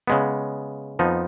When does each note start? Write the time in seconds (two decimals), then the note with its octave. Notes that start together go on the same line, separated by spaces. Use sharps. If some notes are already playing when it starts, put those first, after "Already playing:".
0.08 C#3 G#3 B3
0.99 F2 F3 B3 D#4